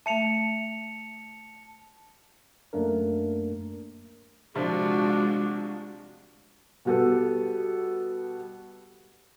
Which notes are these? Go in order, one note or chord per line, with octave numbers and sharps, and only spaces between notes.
A3 E5 A5 C#7 F7
F#2 A3 A#3 D4 A#4
C3 F3 G#3 D4 F4 F#4
B2 G3 B3 G4 A4